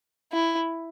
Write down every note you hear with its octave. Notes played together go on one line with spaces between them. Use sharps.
E4